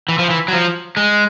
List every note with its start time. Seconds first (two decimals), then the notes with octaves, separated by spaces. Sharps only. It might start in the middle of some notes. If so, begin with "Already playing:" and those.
0.09 E3
0.19 F3
0.30 E3
0.48 F#3
0.53 F3
0.97 G#3